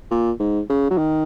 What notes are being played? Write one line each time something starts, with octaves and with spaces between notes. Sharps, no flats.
A#2
G#2
C#3
F#3
D#3